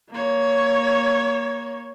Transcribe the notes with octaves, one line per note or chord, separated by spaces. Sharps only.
A#3 C#5